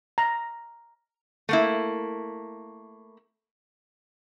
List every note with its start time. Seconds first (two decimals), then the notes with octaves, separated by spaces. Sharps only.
0.18 A#5
1.49 A3 A#3 E4